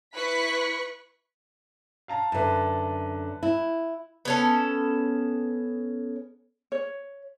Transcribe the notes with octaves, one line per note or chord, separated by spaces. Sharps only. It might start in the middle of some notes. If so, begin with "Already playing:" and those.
E4 B4 C#6 F#6 B6 C#7
F5 A5 A#5
F#2 D3 B4 E5 A5
E4
B3 C#4 A4
C#5